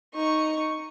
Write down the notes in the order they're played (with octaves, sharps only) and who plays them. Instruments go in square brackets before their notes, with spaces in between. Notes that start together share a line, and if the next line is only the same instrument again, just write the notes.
[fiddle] D#4 C#6